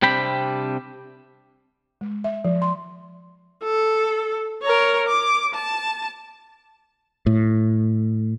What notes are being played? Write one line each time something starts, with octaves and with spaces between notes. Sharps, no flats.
C3 G3 C4 D4 G5 B5
G#3
E5
F3
C6
A4
A#4 C#5
D6
A5
A2